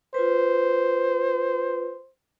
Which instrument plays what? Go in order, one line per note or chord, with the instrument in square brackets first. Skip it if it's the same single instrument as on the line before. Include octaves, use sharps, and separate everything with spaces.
[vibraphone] F4 B4 [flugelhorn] C5